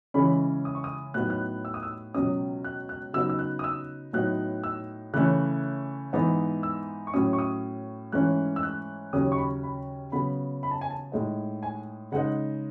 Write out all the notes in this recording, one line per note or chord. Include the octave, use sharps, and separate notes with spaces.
C#3 E3 G#3 C#4 B5
D#6
C#6
D#6
A2 F#3 B3 D#4 F#6
F#6
E6
D#6
E6
C#2 B2 F#3 C#4 D#6
F#6
F#6
C#3 F#3 B3 D#4 E6
E6
F#6
D#6
E6
A2 F#3 B3 D#4 F#6
E6
C#3 E3 A3 C#4 F#6
G#2 E3 B3 D#4
E6
C#6
A2 F#3 C#4 D#6
C#6
D#6
G#2 E3 A3 C#4 F#6
E6
F#6
D#2 C#3 F#3 C#4 D#6
C#6
B5
B5
C#3 F#3 B3 B5
B5
A5
G#5
A5
A2 G#3 D#4
G#5
C#3 G#3 D#4 F#5